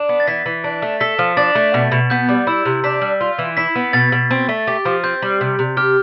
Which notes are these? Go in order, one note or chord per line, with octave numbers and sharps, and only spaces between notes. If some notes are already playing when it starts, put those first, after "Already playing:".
Already playing: D4
B3
A6
E3 B6
E3
D4
A3
A4 B6
F3
D4 A6
A3
B2
B2
B3 G6
G3
E4 E6
C3
D4 B6
G3
F4
E3
E4 B6
B3
B2 A6
B2
C4
A3
G4
F3
C4 G6
G3
C3
C3
G4 F6